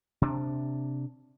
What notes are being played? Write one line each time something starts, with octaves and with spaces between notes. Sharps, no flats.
C3 D4